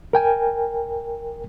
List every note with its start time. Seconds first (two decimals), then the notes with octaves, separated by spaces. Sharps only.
0.13 A#4 G5 G#5